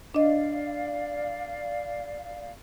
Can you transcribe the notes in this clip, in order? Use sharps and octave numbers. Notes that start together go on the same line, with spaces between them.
D4 D5 D#5 F5